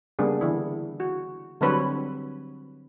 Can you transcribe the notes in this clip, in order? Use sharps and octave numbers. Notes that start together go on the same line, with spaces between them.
C#3 G3 A#3 B3 D4 G#4
D3 E3 E4
F#4
D3 F#3 G3 C4 B4 C#5